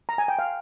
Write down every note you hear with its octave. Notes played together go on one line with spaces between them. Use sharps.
A#5
G#5
G5
F5